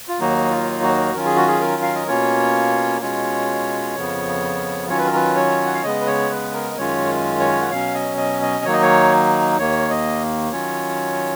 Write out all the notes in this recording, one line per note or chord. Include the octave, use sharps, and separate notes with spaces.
F4
D#2 D#3 F#3 A#3 D#4 F#4
F4
F#4
D#3 F#3 C#4 F4 A#4
G#4
F#4
G#4
A#4
F5
D#5
B2 A#3 C#4 F4 C#5
B2 G#3 C#4 F4 C#5
F2 C#3 F3 B3
D#3 F#3 C#4 F4 C#5
B4
A#4
B4
C#5
F#5
F5
C#3 G#3 B3 D#5
B4
C#5
B4
A#4
D#5
F#2 D#3 G#3 C#4 F4 C#5
C#5
F#5
B2 F#3 C#4 F5
D#5
D#5
D#5
D#3 F#3 A#3 D#4 C#5
D#5
C#5
D#2 D#3 A#3 C#5
D#5
D#3 F#3 C#4 F4 C#5